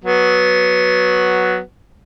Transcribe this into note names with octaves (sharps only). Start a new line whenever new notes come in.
F#3 B3